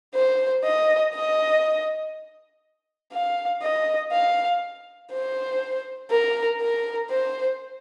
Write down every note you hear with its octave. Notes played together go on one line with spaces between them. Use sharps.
C5
D#5
D#5
F5
D#5
F5
C5
A#4
A#4
C5